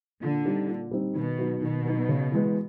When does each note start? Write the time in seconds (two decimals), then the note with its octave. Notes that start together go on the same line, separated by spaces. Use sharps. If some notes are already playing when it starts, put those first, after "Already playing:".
0.21 A#2 D3
0.45 G3 C4 D#4
0.68 A#2
0.91 G3 C4 D#4
1.15 B2 D#3
1.39 F#3 B3 D#4
1.62 B2 D#3
1.85 F#3 B3 D#4
2.09 C#3
2.32 E3 G#3 B3